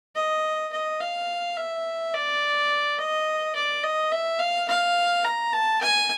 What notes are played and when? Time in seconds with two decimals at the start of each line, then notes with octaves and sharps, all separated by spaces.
0.15 D#5
0.72 D#5
1.01 F5
1.57 E5
2.14 D5
2.99 D#5
3.55 D5
3.83 D#5
4.12 E5
4.40 F5
4.68 F5
5.25 A#5
5.53 A5
5.81 G#5